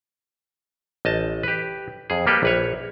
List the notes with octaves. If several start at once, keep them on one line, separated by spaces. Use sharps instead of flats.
A1 D#5 A5
G4 B4
F2 G#4
G3 A#3 G4 A4 B4
A#1 B4 C#5